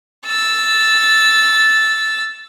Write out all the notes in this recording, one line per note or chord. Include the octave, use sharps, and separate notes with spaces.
E6 A6